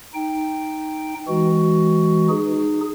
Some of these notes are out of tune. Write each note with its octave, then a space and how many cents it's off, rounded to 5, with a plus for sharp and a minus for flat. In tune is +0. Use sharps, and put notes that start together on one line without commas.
D#4 +0 G5 +0
E3 +0 G#3 +0 F#4 +10
D#4 -25 G#4 +0